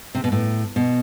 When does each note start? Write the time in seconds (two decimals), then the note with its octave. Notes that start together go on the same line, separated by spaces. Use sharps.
0.15 C3
0.24 B2
0.32 A2
0.76 B2